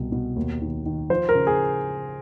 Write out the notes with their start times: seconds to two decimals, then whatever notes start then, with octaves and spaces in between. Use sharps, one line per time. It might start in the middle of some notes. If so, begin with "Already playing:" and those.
Already playing: C2 B2
0.12 B2
0.36 D#2
0.61 D#3
0.86 D#3
1.10 F3 C5
1.29 A#4
1.35 C#3
1.47 G#4